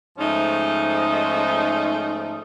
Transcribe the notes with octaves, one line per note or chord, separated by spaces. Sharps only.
G#2 F3 A3 C#4 D#4